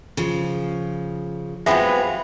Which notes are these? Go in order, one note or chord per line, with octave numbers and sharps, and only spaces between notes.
C#3 F3
F#3 G#3 B3 C4 F4 G4 E5 D#6